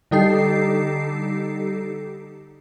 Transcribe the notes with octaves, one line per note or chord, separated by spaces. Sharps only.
D3 G3 D#4 G4 A4 C7